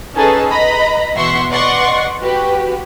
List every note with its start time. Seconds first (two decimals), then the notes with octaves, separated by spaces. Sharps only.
0.15 C#4 D#4 G#4 A4 B4 A5
0.50 B4 D#5 A#5 B5
1.15 B2 E3 E5 F#5 C6 C#6
1.50 B4 D5 D#5 F#5 C6 C#6
2.20 F#4 G4 B4